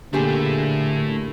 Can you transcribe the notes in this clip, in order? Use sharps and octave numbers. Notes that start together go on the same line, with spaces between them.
A#2 D3 A3 E4 G4 G#4